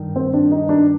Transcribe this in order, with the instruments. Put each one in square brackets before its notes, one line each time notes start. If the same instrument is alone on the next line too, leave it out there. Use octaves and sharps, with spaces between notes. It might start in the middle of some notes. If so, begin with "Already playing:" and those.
Already playing: [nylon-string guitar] G2 D#3
[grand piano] C4
D4
D#4
D4